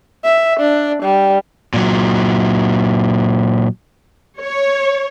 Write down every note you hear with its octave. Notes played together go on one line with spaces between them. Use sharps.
E5
D4
G3
A#2 F#3
C#5